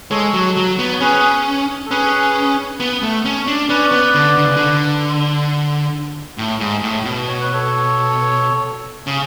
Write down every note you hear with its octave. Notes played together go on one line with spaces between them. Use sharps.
G#3 A4 C#5
F#3
F#3
B3
C#5
C#4 G#4 B4
A4
C#4 G#4 B4
B3
A3
C#4
D4
C#4 B4 D5
B3
D3
D3
C#3
D3
A2
G#2
A2
B2
C#5
B4
A4 C#5
C#3